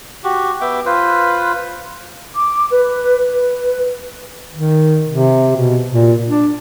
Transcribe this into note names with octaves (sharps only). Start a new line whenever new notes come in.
F#4 G4
B3 E5 G5 D6
F4 B4 C5
D6
B4
B4
D#3
C3
B2
A#2
D4